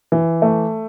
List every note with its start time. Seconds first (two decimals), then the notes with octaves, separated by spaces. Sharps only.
0.12 E3
0.42 A3